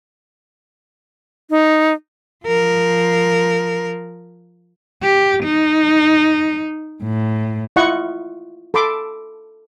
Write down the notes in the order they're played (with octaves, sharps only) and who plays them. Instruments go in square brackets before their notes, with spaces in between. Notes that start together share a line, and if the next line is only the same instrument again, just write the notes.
[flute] D#4
[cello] F3 A#4
G4
D#4
A2
[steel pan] E4 F4 D#5 F#5 C#6
A4 B5 C6 D6